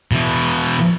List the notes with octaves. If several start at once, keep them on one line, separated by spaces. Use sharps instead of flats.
B2 E3